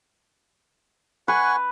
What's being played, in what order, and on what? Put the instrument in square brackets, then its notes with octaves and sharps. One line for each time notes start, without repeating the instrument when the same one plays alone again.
[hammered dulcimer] B4 [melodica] F#5 G#5 C#6